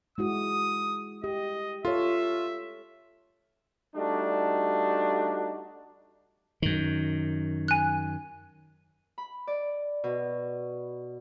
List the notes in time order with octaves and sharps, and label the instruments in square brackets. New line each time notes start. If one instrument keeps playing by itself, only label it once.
[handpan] G#3 E4 F#4 [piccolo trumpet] D#6
[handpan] G4 [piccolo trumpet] D#5
[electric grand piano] F4 [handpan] A4 C#5 [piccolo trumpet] E5
[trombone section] G3 A3 D4 D#4 F#4
[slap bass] F#2 D#3
[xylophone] G#5 F#6
[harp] B5
D5
B2